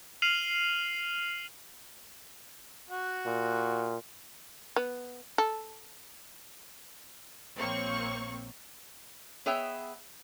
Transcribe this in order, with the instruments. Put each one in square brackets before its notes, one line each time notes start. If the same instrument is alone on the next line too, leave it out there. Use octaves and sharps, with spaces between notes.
[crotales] F6 C7 D#7 F7 F#7
[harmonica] F#4
[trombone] A#2
[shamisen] B3
A4
[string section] A#1 A#3 C4 C#5 C#6
[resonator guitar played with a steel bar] B3 G#4 C#5 E5 G5